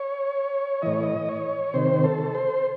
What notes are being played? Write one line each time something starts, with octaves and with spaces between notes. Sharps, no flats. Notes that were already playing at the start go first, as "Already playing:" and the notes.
Already playing: C#5
A2 E3 D#5
C#5
D#5
C#5
C3 D#3 C5
A4
C5